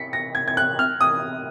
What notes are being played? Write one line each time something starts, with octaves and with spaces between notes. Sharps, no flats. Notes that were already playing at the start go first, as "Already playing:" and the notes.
Already playing: B6 C#7
A#6
G#6
G#6
F#6
F6
D#6